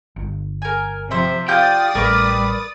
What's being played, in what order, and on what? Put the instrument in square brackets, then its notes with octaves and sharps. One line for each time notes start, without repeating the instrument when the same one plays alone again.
[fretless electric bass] G1
[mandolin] A#4 G#5
[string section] C3 F3 [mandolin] C5 E5
[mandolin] F4 G4 G6 [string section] D5 D#6 A6 [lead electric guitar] G5
[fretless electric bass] A1 A3 [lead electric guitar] G3 [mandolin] A#4 B4 D6